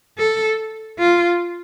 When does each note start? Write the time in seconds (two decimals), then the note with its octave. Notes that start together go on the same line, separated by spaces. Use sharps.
0.18 A4
0.99 F4